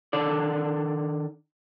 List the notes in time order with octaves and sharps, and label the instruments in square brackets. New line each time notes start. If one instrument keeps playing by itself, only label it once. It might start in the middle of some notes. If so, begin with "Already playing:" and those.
[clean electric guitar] D#3 D4 A4 D5